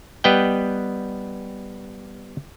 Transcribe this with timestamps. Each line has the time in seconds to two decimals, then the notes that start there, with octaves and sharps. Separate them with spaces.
0.24 G3 B3 B4 D#5 G5